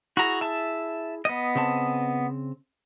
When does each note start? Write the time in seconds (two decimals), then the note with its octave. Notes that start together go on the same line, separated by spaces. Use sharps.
0.17 E4 F#4 G#4 A#5
0.41 E5 A5
1.25 B3 D#5
1.55 C#3 C4 A5